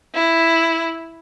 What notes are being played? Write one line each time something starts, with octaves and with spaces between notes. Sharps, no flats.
E4